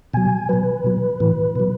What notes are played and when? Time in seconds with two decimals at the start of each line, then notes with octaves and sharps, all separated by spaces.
0.14 B2 F#3 G#5
0.49 B2 F#3 B4
0.84 B2 F#3
1.20 A2 E3
1.56 B2 F#3